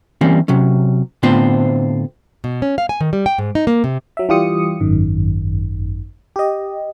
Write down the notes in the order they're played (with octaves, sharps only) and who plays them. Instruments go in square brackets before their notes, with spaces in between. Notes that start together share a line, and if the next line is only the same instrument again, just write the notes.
[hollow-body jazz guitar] E3 G3 A#3 C4 C#4
C3 F#3 C#4
A2 D3 B3 C4 F4 C5
[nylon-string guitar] B2
C#4
F5
G#5
D#3
G3
G5
G#2
D#4
A#3
C3
[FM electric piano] F#3 E5
E3 G3 F4 G4 D#6 C#7
G#1 F#2 D#3
G4 D#5